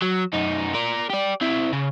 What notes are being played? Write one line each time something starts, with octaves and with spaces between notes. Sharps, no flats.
F#3
F#2 D#4
A#4 D5
G4 D5
C4 E4
C#3